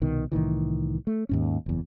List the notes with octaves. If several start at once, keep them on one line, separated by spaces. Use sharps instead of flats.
C2 B2 D#3
C2 A2 D#3 E3
A3
D#2 G#2 C#4
F#1 E2